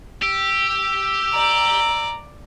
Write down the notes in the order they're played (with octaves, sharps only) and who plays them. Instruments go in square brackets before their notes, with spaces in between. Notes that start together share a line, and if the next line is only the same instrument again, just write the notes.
[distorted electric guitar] G4 [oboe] E6
[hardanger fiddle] D5 [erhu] A#5